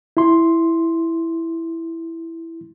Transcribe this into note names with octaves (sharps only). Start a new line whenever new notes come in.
E4 C6